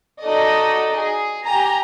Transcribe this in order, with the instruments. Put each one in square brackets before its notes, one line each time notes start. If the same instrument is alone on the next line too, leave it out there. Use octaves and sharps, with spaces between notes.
[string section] D#4 F#4 A4 D5 D#5
G#4
G4 G#5 A#5